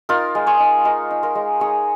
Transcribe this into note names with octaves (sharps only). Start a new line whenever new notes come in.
D#4 F4 A#4
G#3
G#4 C#5
D#4
G#3 F4 A#4
D#4
F4 A#4
G#3
D#4 G#4 C#5